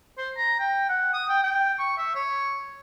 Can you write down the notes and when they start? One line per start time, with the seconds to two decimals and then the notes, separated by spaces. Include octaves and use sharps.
0.18 C5
0.37 A#5
0.60 G5
0.89 F#5
1.13 D#6
1.29 G5
1.43 G5
1.79 C#6
1.98 E5
2.15 C#5